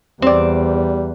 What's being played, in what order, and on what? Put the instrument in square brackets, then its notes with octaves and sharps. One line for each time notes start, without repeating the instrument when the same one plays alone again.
[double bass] E2 [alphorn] G3 [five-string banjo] C4 D5